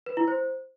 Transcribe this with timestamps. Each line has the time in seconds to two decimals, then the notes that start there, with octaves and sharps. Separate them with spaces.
0.06 B4
0.17 E4
0.28 C5